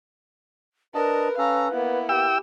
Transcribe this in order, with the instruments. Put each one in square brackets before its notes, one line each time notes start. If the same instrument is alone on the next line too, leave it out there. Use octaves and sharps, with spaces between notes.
[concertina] D4 D#5 A5 [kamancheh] A#4 [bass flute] B4
[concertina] C#4 A4 [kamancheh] F5 A#5
[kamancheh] A#3 B3 [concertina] E4
[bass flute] G4 [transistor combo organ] G5 E6